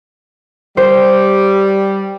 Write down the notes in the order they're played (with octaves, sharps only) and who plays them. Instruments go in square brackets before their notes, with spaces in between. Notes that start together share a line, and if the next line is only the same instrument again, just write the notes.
[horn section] G3 [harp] C5